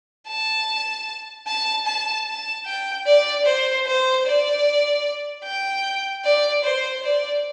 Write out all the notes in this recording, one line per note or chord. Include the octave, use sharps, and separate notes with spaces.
A5
A5
A5
A5
G5
D5
C5
C5
D5
G5
D5
C5
D5